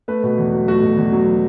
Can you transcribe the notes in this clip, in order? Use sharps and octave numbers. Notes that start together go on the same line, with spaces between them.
A3 B4
B2
E2
F#3
A3 F#4
B2
E2
F#3